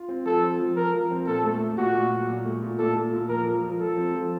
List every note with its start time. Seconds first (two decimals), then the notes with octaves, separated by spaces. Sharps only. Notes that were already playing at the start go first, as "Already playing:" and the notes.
Already playing: F4
0.08 C4
0.25 F3 A4
0.43 C4
0.59 F3
0.76 F3 A#4
0.94 F3
1.11 C4
1.27 A#2 A4
1.44 A3
1.60 A3
1.78 A#2 F#4
1.94 A#2
2.12 F#3
2.28 A#2
2.45 A3
2.62 A#2
2.79 A#2 A4
2.96 A#2
3.13 A#2
3.29 F3 A#4
3.46 F3
3.62 F3
3.80 F3 A4
3.96 C4
4.14 F3